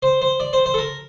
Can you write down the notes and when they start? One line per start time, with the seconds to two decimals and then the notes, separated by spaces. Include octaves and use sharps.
0.03 C5
0.22 C5
0.40 D5
0.53 C5
0.66 C5
0.74 A4
0.78 A#4